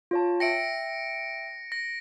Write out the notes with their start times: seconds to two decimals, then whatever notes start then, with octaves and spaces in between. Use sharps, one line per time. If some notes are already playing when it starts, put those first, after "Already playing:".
0.11 F4 C#5 A5
0.40 E5 G5 A#6 C#7 D7
1.72 A#6